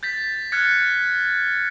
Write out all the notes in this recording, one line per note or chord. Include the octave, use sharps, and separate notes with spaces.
G6 A6 B6
F6 F#6 G#6 A6 C#7